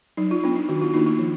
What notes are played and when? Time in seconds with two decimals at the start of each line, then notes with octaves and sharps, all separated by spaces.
0.17 F#3 D#4
0.31 F4
0.44 B3 D4
0.56 D#4
0.69 D#3 F#4
0.82 F4
0.94 A#3 D4 D#4
1.06 F4
1.19 F3